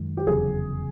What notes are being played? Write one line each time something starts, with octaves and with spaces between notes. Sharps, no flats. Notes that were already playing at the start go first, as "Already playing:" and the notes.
Already playing: F#2 D#3 G#3
G4
F1 E2 C#3 F#3 G#4